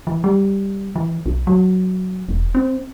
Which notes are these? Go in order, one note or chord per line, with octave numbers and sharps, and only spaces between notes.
E3
G3
E3
B1
F#3
E1
C4